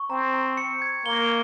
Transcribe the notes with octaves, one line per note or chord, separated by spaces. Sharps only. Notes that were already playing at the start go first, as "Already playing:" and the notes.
Already playing: C#6
C4 A#5
A#5
C#7
G#6
A#3 G7